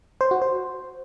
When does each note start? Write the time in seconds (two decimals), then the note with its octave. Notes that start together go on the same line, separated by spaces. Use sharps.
0.21 C5
0.31 F#4
0.42 C5